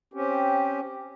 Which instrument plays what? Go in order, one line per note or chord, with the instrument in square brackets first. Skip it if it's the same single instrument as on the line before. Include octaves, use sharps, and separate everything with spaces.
[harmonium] C4 C#4 G4